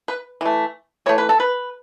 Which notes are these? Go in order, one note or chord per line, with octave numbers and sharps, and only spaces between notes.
B4
E3 A3
E3 A3 C#5
B4
A4
B4